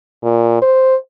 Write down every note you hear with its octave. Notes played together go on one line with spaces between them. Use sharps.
A#2
C5